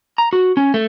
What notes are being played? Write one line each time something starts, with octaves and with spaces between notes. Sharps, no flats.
A#5
F#4
C#4
A3